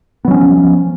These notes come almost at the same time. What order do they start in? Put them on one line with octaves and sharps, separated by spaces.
B3 F#3 C#4 F3